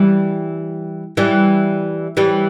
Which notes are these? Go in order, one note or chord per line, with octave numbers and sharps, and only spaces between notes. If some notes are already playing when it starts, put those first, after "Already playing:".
Already playing: E3 G3
E3 G3
E3 G3